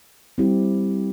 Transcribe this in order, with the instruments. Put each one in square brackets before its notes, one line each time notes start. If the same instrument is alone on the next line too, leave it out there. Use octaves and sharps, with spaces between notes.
[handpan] G3 C4 E4 G4